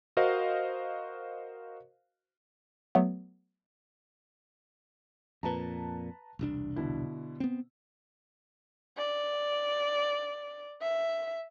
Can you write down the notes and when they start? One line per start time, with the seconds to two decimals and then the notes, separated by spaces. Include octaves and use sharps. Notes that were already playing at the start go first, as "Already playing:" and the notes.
0.17 F#4 A#4 C5 D#5 F5
2.95 F#3 A3 B3
5.43 F2 A#2 B4 A5 A#5
6.39 E1 C2 D4
6.76 B2 D3 E4
7.40 B3 C4
8.97 D5
10.82 E5